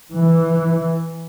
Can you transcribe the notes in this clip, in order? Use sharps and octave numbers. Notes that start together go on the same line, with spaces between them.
E3